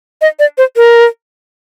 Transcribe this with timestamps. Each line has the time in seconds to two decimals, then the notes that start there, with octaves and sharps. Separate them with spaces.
0.21 D#5
0.39 D5
0.58 C5
0.77 A#4